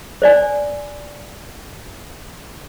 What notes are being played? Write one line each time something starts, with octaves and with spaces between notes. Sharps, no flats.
C5 D5 G#5